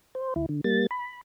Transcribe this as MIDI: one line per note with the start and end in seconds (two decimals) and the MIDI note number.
0.15 0.34 72
0.36 0.46 38
0.36 0.46 64
0.49 0.61 50
0.64 0.86 55
0.64 0.86 58
0.64 0.86 93
0.91 1.21 83